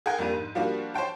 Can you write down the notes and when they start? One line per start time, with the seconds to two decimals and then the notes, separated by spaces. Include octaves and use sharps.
0.06 G#4 A#4 F#5 G5
0.18 F2 G3 A#3 D4 D#7
0.33 G#2
0.55 F3 G3 A#3 D4 F4 F#4
0.94 C5 C#5 G5 A5